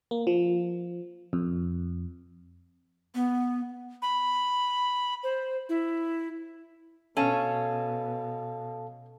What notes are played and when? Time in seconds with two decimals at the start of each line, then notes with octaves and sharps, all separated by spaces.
0.11 A#3
0.27 F3
1.33 F2
3.15 B3
4.02 B5
5.24 C5
5.69 E4
7.17 B2 C#4 A4 F5 A5